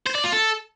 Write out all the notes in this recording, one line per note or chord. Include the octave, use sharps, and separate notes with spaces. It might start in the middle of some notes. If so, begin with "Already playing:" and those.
C5
D5
F4
A4